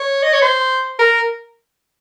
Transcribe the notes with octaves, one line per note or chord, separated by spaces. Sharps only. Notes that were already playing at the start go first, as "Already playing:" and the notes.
Already playing: C#5
D#5
C#5
C5
A#4